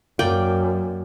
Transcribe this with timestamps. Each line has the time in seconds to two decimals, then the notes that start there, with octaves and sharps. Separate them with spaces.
0.19 F#2 A#3 D5 G5